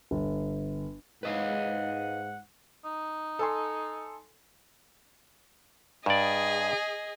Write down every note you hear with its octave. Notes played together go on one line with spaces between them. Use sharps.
G1
G#2 B4 D#5 F5 F#5
D#4
A4 G#5 C6
G2 G#4 D5 D#5